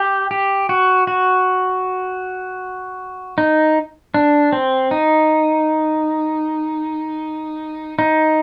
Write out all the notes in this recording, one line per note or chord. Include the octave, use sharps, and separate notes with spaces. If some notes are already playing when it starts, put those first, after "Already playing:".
Already playing: G4
G4
F#4
F#4
D#4
D4
C4
D#4
D#4